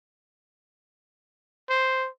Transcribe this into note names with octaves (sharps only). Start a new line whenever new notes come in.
C5